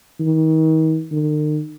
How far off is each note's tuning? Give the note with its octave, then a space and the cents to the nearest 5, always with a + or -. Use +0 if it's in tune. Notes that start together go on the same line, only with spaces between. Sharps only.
D#3 +35
D#3 -45